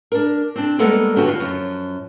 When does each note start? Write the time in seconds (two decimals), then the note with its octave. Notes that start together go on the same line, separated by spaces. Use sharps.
0.12 D4 A#4
0.56 C4 D4
0.78 G3 G#3 A#3 B3 A4
1.16 G2 D3 F#4 G4 B4 G5
1.28 F4
1.40 F#2 F3